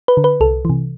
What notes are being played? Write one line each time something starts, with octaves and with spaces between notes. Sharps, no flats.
B4
D3
B4
C2 A4
C3 E3